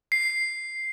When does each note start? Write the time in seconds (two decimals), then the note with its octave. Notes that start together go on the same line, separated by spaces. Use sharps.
0.12 C7